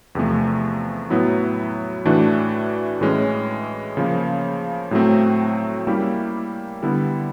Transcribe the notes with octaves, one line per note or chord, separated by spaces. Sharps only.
E2 C3 F3 A3
A2 F#3 B3 E4
A2 E3 A3 D4 F#4
A2 E3 G#3 C#4
C#3 F3 A#3
A2 F#3 A3 C4
G3 A#3 C#4 E4 G4
D3 G3 B3 E4